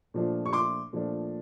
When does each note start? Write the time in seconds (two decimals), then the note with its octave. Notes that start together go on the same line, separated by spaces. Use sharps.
0.14 A#2 F3 A3 D4
0.46 C#6
0.53 C6 D6
0.93 A#2 F3 A3 D4